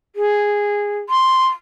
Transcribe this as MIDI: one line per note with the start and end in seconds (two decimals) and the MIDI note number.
0.16 0.99 68
1.09 1.46 84